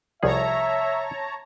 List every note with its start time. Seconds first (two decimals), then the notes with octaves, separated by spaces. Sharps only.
0.23 C2 F3 G#4 C#5 E5 A5 A#5